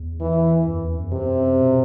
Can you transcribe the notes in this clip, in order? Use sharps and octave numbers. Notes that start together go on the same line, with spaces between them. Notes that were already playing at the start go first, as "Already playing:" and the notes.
Already playing: E2
E3
F#2
E2
F#2
C3
B2